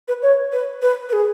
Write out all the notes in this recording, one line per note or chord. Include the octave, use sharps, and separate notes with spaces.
B4
C#5
B4
B4
B4
G#4